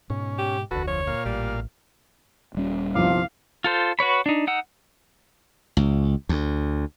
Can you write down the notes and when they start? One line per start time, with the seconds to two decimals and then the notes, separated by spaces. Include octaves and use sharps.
0.10 G#2 B2 C#4
0.38 G4
0.71 F1 D2 F#4 A4 B4
0.88 F3 C#5
1.07 A#2 F5
1.25 A1 G3
2.54 D#1 G3 C#4
2.95 G1 C2 F3 F5 D6
3.64 F4 A4 C5
3.99 F#4 B4 C#5 B5
4.26 D4 D#4
4.47 D#4 F#5 E6
5.77 C#2
6.29 D2